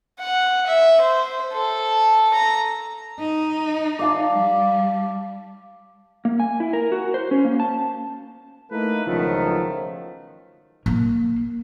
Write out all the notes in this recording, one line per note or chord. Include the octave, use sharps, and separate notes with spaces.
F#5
E5
C5
A4
A#5
D#4
D5 F5 A5
G3
A#3
G#5
E4
A#4
F#4
C5
C#4
A#3
A5
A3 A#3 D#4 E4 A4 B4
C#2 B2 D#3 F3 F#3 A3
A#3